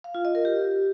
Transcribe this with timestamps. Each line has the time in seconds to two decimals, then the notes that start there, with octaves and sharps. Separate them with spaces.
0.04 F5
0.15 F4
0.25 D#5
0.35 A#4
0.45 G4